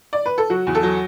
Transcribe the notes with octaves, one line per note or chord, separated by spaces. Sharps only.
D5
B4
A4
F#3 F#4
E2
A4
F#3